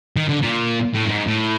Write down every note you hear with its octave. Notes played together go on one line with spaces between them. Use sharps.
D#3
D3
A#2
A2
G2
G#2
A2